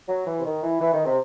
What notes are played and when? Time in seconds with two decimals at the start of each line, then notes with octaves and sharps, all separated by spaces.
0.08 F#3
0.27 E3
0.39 C3
0.45 D#3
0.63 E3
0.81 E3
0.94 D#3
1.06 C3